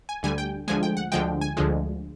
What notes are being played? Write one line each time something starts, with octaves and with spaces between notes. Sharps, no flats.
G#5
D2 D3 G3 G#5
G5
D2 D3 F3 G#3 G#5
G5
F#5
D2 D3 F3 G#3 G5
G#5
D2 D3 F3 G#3